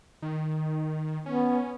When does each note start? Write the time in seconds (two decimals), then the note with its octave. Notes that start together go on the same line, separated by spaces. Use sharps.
0.22 D#3
1.26 B3 C#4